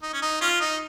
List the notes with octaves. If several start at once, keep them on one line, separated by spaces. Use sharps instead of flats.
D#4
C#4
D#4
C#4 F4
D#4